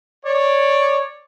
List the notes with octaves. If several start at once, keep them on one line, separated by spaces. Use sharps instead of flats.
C#5 D5